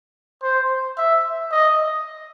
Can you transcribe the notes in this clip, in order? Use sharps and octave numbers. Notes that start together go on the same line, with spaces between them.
C5
E5
D#5